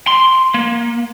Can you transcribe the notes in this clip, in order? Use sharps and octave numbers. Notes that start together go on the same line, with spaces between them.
C6
A#3